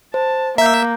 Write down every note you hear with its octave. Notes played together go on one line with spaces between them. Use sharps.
C5 A5
A#3 E5 A#5 G6